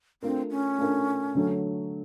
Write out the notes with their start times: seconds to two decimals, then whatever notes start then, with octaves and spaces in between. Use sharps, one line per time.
0.23 A3 C4 D4 F4 A#4
0.51 C#4
0.79 A3 D4 F4 A#4
1.35 D3 F#3 A3